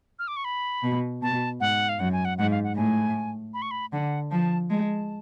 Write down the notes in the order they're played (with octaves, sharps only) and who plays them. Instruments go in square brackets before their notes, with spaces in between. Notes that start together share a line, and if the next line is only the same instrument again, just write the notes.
[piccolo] F6
D6
C#6
B5
[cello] B2
[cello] B2 [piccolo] A5
[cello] G#2 [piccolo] F#5
[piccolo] F5
[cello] F#2 [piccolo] F#5
[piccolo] G#5
F#5
[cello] G#2 [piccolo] F#5
[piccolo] F5
F#5
[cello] A2 [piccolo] G#5
[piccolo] B5
C#6
B5
[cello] D3 [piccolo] F#5
[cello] F3 [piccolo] A5
[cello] G#3 [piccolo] A5